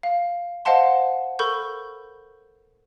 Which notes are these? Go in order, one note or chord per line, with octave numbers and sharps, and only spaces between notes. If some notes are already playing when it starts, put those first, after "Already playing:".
F5
C5 D#5 F5 F#5 A5 C6
A4 A#4 B5 C#6 G6